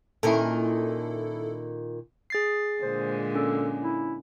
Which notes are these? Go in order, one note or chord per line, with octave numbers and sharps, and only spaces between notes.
A#2 D#3 C#4 E4 A4
G#4 A6 C7
A#2 D3 G#3 C5
C#4 A4
E4